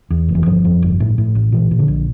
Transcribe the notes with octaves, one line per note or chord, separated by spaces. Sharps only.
E2
F1
E3
G1 F3
F2
G1
A2
A2
A1
A#2 E3
A#2
D3
A#1